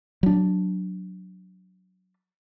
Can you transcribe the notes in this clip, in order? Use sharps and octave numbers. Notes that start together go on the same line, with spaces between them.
F#3 D4